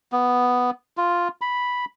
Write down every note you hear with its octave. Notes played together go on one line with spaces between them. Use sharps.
B3
F4
B5